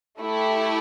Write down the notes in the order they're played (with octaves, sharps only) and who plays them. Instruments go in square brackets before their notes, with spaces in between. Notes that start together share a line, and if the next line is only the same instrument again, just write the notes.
[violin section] A3 E4 G4